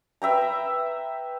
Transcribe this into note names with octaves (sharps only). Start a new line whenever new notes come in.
B4 E5 G5 A#5